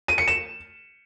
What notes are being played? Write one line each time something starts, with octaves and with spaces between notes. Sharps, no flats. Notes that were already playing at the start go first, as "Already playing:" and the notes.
D#7
C#7
E7